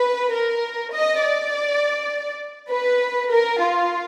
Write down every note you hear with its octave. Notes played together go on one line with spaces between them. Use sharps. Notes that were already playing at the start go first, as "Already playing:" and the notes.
Already playing: B4
A#4
D#5
D5
B4
A#4
F4